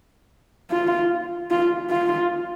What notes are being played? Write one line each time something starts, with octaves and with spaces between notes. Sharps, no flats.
F4
F4
F4